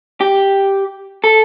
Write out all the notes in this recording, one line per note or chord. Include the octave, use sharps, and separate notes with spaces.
G4
A4